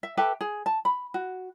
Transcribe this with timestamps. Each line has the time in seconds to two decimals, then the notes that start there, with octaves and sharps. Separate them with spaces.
0.03 E5
0.17 G4 A4 B4 E5
0.41 G#4
0.66 A5
0.85 B5
1.14 F#4